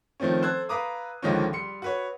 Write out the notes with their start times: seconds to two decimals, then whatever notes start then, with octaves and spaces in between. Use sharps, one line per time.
0.20 D#3 F3 A3 C4 C#4
0.42 A4 C5 E6 F#6 G#6
0.69 B4 F5 A#5 D6 D#6
1.22 C#2 D3 D#3 F3 A#3 C#4
1.52 G3 C6 C#7
1.82 F#4 B4 C#5